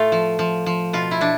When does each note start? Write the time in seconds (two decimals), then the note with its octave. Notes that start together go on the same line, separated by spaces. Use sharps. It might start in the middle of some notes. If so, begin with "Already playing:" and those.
Already playing: A2 A3 F4
0.12 F3
0.39 F3
0.66 F3
0.93 B2 F4
1.11 E4
1.21 B2 D4